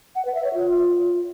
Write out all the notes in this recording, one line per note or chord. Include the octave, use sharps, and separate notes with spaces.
F#5
B4
E5
C#5
F4